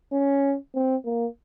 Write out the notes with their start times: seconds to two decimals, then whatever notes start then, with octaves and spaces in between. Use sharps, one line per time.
0.12 C#4
0.75 C4
1.05 A#3